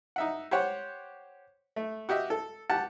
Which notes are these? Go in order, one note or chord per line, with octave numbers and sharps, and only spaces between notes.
D#4 E5 F#5
G4 C5 C#5 F#5
A3
F#4 G4 D#5 E5
A4
G4 F#5 A5